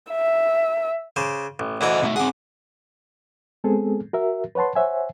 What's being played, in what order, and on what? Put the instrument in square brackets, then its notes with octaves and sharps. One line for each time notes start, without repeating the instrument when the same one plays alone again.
[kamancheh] E5
[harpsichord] C#3 C5 D6
A1
[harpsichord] D2 E3 A#5 [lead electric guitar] C5 D#5
[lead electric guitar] B2 A3
[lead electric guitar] C4 G#4 [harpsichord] F#5 D6
[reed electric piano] G#3 B3 C4 G#4 A4
F#4 A#4 E5
B4 C#5 F#5 A5 C6
C5 C#5 E5 F#5 G#5